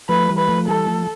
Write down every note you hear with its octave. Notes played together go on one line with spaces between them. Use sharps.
F3 A3 B4
E3 G3
B4
F3 A3
E3 G3 A4
F3 A3